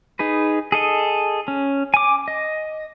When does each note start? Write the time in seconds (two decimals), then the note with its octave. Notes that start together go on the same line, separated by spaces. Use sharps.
0.19 D#4 G#4 B4
0.72 G#4 A4 D#5
1.48 C#4
1.94 G#5 D6
2.28 D#5